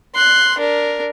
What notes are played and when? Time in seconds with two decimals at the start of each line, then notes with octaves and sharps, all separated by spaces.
0.15 C6 F#6
0.59 D4 A#4